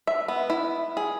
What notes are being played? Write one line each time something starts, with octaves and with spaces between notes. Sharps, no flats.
E5
B3
E4
G#4